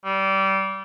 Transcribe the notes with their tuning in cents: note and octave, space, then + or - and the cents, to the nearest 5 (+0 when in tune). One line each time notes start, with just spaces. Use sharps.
G3 -25